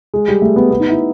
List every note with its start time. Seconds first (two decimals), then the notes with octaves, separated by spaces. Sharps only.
0.14 G#3
0.28 G3
0.42 A3
0.56 B3
0.71 B3
0.80 D#4
0.89 E4